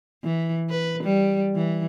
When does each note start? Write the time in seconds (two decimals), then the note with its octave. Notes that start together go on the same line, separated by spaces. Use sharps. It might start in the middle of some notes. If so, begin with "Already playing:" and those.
0.24 E3
0.70 B4
1.03 G3
1.55 E3